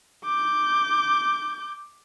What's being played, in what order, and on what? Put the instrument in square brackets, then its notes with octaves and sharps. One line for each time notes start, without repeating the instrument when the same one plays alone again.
[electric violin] D6 G6